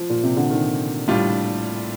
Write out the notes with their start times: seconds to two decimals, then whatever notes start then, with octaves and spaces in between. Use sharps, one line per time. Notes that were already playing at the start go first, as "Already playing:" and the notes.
Already playing: F3
0.10 A#2
0.23 C3
0.37 D3
0.50 D#3
1.08 A2 G3 D4 F4